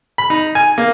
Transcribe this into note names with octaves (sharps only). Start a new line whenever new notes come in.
B5
D#4
G#5
A#3